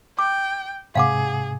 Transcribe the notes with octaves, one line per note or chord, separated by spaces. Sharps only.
G5 D6
G#2 C3 G#4 F5 F#5 D6